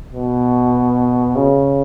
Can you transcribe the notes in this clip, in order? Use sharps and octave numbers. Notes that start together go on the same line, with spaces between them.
B2
C#3